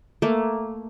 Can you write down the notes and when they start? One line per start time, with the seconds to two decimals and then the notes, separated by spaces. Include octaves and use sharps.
0.22 A3 A#3